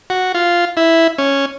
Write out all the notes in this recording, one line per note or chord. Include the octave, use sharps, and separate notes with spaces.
F#4
F4
E4
C#4